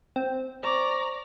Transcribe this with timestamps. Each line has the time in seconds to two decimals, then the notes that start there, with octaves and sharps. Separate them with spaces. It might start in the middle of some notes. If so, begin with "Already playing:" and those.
0.16 C4
0.63 C5 D5 A#5 C#6 D6